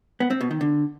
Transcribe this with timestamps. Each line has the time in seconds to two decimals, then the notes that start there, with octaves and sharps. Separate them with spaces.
0.20 B3
0.30 C4
0.41 B2
0.51 D#3
0.61 D3